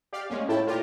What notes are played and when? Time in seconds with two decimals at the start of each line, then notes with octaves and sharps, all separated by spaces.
0.13 G4 D5 F5
0.30 G#3 A#3 C#4
0.49 A2 E4 G5 A5
0.67 A#2 F4 G4 A#4